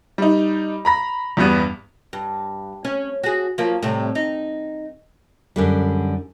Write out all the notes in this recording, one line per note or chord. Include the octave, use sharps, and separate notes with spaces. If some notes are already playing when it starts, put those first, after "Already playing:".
G3 D#4
A#5 B5 A#6
E2 G2 G3 B3
G2
C#4
F#4 G#4
F3 F#3 A#3
A2 C3 G3
D#4
F#2 D3 G3